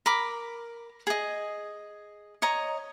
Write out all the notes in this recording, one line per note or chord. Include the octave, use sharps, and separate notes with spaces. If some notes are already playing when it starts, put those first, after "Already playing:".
A#4 B5 D6
G#4 D#5
C#5 D#5 A#5